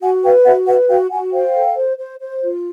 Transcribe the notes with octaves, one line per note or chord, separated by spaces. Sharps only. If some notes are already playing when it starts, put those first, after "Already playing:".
F#4 F#5 G#5
B4 F5 G5
F#4 E5 F#5
B4 E5 F#5
F#4 F5 G5
F#4 F#5 G#5
C5 F5 G5
A4
C5
C5
C5
F4